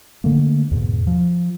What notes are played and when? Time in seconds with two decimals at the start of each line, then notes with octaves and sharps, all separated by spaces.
0.24 D3 A3 A#3
0.71 E2 G#2 B2
1.07 F3